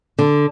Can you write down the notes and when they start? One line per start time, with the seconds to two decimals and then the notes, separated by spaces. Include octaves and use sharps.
0.19 D3